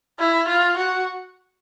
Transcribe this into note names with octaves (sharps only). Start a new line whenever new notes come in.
E4
F4
F#4